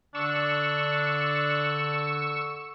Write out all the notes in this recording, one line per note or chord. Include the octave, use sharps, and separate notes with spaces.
D3 D4 C#6 E6